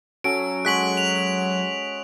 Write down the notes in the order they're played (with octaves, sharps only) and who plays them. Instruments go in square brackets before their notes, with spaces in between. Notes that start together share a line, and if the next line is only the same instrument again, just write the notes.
[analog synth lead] F#3 [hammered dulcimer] C#4 A4 [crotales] D7
[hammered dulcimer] G#3 F#4 C#5 [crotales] F#6 B6 F#7
[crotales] F7